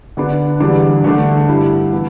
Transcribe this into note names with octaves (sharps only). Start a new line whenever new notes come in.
D3 B3 D4
E2 D3 G3 D4
D3 A3 D4
G2 G3 E4
E3 B3